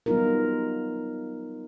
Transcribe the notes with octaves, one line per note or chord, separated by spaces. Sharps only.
F#3 G3 B3 D#4 F4 A#4